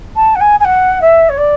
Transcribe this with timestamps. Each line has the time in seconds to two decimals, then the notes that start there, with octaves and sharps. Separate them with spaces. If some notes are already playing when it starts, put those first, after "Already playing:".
0.16 A5
0.35 F#5
0.41 G#5
0.60 G#5
0.65 F#5
1.01 E5
1.29 C#5
1.38 D5